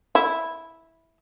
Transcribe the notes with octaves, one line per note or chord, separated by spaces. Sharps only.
E4